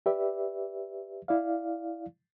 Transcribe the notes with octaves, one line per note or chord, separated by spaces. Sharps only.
G4 B4 D5 E5
E4 D5 F5